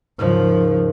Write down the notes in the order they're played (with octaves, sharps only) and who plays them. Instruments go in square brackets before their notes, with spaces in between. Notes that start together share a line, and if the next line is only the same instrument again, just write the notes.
[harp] D#2 G#2 C#3 [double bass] F3